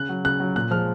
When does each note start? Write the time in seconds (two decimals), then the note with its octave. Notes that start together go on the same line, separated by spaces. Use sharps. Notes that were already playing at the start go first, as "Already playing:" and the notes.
Already playing: C#3 F#6
0.09 F#3
0.25 C#3 F#6
0.40 F#3
0.56 A#2 F#6
0.71 F3 G#3 F6